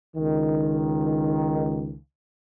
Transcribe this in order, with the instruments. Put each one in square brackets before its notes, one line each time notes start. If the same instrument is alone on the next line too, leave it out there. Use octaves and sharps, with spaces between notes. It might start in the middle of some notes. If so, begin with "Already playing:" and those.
[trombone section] C#2 D#3